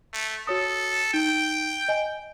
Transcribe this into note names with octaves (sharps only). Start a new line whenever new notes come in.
A3
F#4 A4 C#5 D#6
D#4 G5
D#5 G#5